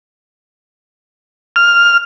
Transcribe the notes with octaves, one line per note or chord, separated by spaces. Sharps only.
F6